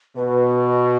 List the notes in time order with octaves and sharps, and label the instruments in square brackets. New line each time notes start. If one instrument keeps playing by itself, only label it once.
[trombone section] B2 [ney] B4